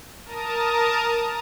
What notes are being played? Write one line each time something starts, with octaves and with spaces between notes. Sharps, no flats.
A#4 A5 A#5 D#6